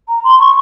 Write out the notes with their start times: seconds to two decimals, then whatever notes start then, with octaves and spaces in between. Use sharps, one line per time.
0.08 A#5
0.24 C6
0.40 C#6